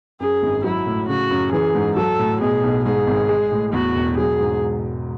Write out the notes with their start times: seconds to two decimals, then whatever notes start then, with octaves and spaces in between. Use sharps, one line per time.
0.20 F#2 G#4
0.43 G#1
0.64 F#3 E4
0.87 A2
1.08 C#3 F#4
1.31 F#2
1.52 E3 G#4
1.75 G#2
1.96 F#3 A4
2.19 A2
2.41 B2 G#4
2.63 B1
2.85 G#2 G#4
3.07 G#1
3.29 G#3
3.52 A2
3.73 E2 F#4
3.95 E1
4.18 F#3 G#4
4.40 G#2